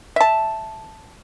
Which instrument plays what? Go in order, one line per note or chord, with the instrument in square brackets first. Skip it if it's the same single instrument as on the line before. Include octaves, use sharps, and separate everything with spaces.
[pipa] E5 A5